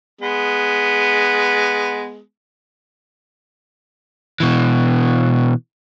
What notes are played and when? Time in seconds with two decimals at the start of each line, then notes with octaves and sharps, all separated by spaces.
0.21 G#3 B3
4.40 B2 E3